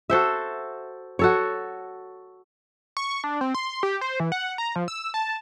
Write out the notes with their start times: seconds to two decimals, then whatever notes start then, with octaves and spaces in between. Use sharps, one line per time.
0.10 F#4 A4 C5 E5
1.19 F#4 A4 C#5
2.97 C#6
3.24 D4
3.41 C4
3.55 C6
3.83 G4
4.01 C5
4.20 E3
4.32 F#5
4.58 A#5
4.76 F3
4.88 E6
5.14 A5